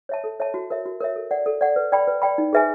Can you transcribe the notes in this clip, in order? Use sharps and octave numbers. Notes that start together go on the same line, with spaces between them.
C#5 E5 A5
A4
C#5 E5 A5
F#4
A#4 C#5 E5
F#4
A#4 C#5 E5
A4
D5 F#5
A4
D5 F#5
B4
D5 G5 B5
B4
D5 G5 B5
D#4
G#4 B4 E5 G#5